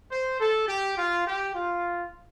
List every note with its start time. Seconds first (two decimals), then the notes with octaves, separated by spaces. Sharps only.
0.10 C5
0.39 A4
0.67 G4
0.97 F4
1.25 G4
1.53 F4